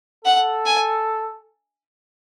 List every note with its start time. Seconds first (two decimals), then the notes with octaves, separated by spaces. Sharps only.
0.25 A4 F#5
0.65 G#5